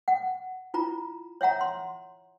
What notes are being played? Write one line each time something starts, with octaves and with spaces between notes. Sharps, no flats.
F#5
E4 F4 A#5
C#5 E5 F#5 A#5
C6